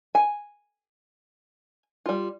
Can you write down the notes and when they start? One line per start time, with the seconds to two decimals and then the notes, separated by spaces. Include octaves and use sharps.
0.15 G#5
2.06 G3 F4